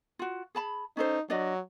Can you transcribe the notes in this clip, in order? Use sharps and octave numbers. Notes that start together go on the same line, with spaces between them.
F4 F#4
G#4 A5 B5
C#4 D#4 A4 C5
F#3 D4 D5 D#5